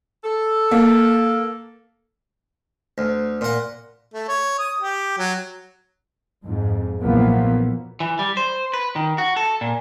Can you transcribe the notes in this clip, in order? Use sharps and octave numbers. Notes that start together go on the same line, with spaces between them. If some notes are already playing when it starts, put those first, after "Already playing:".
A4
A#3
D2
A#2 F#5
A3
C#5
D#6
G4
F#3
F2 G#2
B1 A#2 E3 F3 A#3 B3
E3
G3
C5
B4
D#3
F#4
A4
A#2